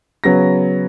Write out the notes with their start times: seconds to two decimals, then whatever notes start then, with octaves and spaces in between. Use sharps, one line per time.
0.24 C#3 F#3 B3 A#6